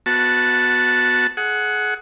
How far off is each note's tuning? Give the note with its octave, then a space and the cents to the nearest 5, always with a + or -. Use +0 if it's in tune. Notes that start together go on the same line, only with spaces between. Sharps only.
B3 +0 F#4 -10 A5 +0
G#4 +30 F#5 +0